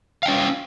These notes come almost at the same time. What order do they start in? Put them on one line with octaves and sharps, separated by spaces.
F5 G5 C#4